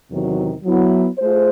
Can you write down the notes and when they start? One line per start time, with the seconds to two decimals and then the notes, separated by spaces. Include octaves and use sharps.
0.09 E2 C3 D#3 F#3
0.64 F#3 B3 E4
1.19 A3 F4 G#4 C5